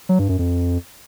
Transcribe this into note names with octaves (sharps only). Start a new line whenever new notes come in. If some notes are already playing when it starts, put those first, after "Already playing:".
F#3
G2
F#2
F2